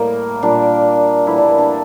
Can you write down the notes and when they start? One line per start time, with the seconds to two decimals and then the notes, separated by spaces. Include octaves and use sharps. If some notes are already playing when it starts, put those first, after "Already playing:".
Already playing: A2 G3 A#3
0.42 A#2 G3 D4
1.27 A2 E3 G3 E4
1.38 D4
1.49 A#3
1.58 D4